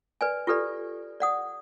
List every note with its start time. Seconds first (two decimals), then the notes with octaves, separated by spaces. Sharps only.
0.21 B4 D5 G#5
0.47 F4 G4 A4 B4 D5
1.20 D5 F#5 D#6